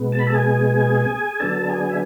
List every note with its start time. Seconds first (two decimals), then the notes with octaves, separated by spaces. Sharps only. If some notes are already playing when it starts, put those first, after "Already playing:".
Already playing: B2 G#3 B3
0.12 A5
0.19 B5
0.27 A4 A5
0.34 G#4 G#5
1.40 D3 F#3 B3 D4 A4 A5
1.69 G#4 G#5
1.89 E5